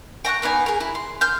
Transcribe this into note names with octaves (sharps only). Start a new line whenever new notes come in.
G5 A#5 C#6 F#6
A#3 B3 D#4 G#5
G#4 A#4
E4
C6
C6 F6 G6